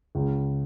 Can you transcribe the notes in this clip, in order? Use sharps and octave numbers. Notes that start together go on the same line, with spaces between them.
C#2